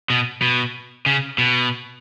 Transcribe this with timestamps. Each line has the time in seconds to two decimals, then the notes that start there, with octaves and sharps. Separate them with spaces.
0.10 B2
0.42 B2
1.06 C#3
1.38 B2